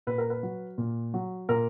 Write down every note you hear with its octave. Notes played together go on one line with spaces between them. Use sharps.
A#2 B4
A#4
B4
F#3
A#2
F#3
A#2 A#4